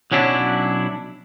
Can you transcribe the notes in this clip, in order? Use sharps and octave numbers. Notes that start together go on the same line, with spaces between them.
B1 F#3 C#4 D4 E4